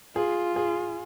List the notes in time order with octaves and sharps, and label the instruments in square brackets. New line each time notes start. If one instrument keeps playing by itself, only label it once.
[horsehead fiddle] F4 [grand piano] G#4
[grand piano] G#4